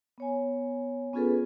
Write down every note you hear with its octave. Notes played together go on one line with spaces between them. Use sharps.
B3 C#5 G#5
B3 C#4 F4 G#4 A4 B4